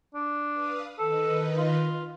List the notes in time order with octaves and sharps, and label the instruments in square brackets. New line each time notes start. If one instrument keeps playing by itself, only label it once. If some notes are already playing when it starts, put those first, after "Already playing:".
[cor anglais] D4
[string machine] B4 F5 D#6
[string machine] D#3 D#4 B4 [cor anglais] A4
[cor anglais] F4